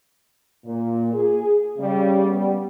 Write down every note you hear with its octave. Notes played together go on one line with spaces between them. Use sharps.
A#2
G#4
C#3 G3
G3 B3